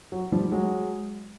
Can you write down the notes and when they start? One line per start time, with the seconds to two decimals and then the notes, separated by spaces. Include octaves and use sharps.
0.12 F#3
0.32 F3 G3
0.52 F#3 G#3